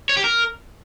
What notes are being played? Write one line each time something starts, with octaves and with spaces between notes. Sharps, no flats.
C#5
G4
A#4